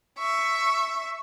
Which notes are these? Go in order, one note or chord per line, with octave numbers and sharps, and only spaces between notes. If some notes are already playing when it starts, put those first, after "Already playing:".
E5 C#6